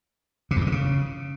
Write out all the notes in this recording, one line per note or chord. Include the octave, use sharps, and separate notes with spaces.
C3
E2
A2
D3
C#3